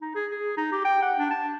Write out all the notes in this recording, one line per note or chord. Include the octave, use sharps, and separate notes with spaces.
D#4
G#4
G#4
D#4
G4
G5
F#5
D4
A5